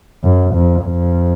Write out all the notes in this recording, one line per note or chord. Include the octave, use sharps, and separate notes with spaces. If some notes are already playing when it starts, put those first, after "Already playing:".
F#2
F2
F2